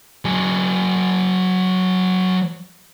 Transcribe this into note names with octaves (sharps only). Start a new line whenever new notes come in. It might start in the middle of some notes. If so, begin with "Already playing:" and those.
F#3 G#4